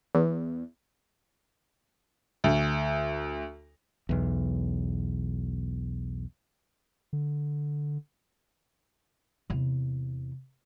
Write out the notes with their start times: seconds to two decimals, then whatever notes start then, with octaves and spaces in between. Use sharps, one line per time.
0.15 E2
2.44 D2
4.09 B1 E2
7.13 D3
9.50 E2 C3